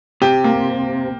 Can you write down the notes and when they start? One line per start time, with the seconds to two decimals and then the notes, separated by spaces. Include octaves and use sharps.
0.22 C3 G4
0.44 A#3